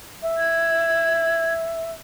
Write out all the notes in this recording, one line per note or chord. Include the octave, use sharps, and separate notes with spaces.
E5
G#6